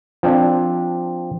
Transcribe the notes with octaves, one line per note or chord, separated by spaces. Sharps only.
F3 C4 D4